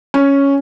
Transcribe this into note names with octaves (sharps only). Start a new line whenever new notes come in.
C#4